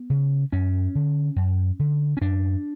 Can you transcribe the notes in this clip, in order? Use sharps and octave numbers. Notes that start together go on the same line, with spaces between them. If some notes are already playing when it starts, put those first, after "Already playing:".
Already playing: B3
C#3
F#2 C#4
D3
F#2
D3
C#4
F#2 D4